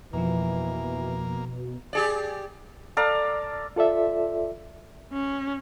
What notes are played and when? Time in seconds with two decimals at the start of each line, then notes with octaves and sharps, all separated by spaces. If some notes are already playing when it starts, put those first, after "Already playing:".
0.13 F2 B2 E3 F3 A#3
1.93 G4 G#4 D5
2.97 A4 D5 F5 A#5
3.76 F4 A4 D5 E5
5.12 C#4